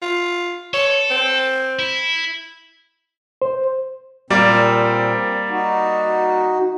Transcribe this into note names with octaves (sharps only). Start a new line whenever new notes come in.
F4
A4 C#5
C4
E4
C5
A#2 G3 A#3 C4 D5
D#4 F#4